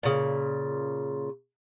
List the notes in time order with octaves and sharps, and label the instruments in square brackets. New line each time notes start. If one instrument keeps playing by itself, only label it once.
[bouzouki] A#2 C#3